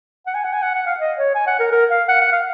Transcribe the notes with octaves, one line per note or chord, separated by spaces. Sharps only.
F#5
G#5
F#5
G#5
F#5
F#5
F5
D#5
C#5
G#5
F#5
A#4
A#4
F5
F#5
F#5
F5